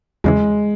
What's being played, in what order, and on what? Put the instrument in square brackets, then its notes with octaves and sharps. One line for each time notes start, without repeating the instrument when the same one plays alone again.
[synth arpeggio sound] E2 C#3 E3 [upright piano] G#3